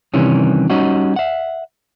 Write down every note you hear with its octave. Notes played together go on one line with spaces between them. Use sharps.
C3 D#3 E3 G3 C#4
G3 C#4 D#4 F#4
E5 F#5